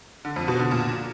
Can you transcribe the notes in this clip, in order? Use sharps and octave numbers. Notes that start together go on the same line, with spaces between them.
D3
F2
B2
D3
A#2